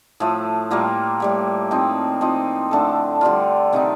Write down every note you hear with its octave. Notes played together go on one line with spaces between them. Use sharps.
A2 F3 A3
A2 G3 A#3 F4
A2 G3 A#3
F3 C4 D#4
F3 C4 D#4
D3 A3 D4 A4
D3 G3 D4 F4
C3 D#3 A3 D#4